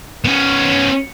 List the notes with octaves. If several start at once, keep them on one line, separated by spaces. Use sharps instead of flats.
B3 C#4